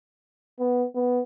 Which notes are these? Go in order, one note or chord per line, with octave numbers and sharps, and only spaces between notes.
B3
B3